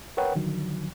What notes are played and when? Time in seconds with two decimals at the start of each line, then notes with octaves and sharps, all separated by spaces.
0.17 A#4 B4 C#5 F#5 G5
0.35 D3 D#3 F3 F#3